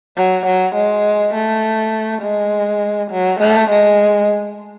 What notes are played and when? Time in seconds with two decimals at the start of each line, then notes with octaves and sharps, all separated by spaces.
0.17 F#3
0.46 F#3
0.75 G#3
1.34 A3
2.22 G#3
3.11 F#3
3.40 A3
3.70 G#3